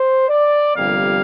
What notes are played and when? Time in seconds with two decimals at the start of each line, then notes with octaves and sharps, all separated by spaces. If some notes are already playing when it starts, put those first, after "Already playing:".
Already playing: C5
0.29 D5
0.76 G1 F2 C3 G3 A#3 F5